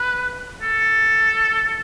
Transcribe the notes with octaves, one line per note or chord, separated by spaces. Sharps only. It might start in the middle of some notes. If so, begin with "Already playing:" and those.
Already playing: B4
A4